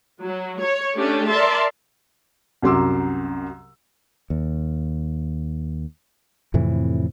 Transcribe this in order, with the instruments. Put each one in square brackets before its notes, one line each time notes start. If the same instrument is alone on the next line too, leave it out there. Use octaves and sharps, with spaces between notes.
[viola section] F#3
C#5
A3 C#4 D4 G4
A#4 D5 E5 A5 C6
[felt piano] C2 F#2 F#3 C6 D6 E6
[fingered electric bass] D#2
F2 A2 C3 E3